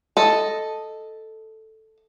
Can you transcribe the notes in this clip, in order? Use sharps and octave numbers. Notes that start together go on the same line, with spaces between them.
A4 D#5